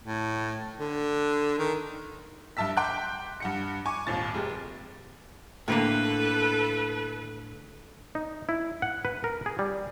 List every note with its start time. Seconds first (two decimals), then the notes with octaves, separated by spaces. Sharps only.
0.05 A2
0.80 D3
1.59 D#3
2.57 G2 E5 A5 E6 B6
2.77 G5 C6 D6 F#6 G6
3.40 G2 F#5 C#7
3.86 G#5 C#6 D6
4.07 G#1 D#2 A#2 A6
4.34 F1 G#3 G4
5.68 A2 D3 A#3 A4 B4
8.15 D#4
8.49 E4
8.82 F#5
9.05 B4
9.24 A#4
9.46 G#4
9.59 G3